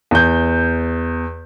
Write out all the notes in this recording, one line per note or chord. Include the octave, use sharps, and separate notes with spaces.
E2 G6